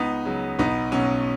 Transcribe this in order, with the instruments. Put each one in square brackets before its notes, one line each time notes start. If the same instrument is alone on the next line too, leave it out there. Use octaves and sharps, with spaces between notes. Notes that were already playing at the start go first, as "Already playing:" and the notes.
Already playing: [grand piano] C#2 B3 D#4
C#3 F#3
B1 B3 D#4
B2 F#3 C#4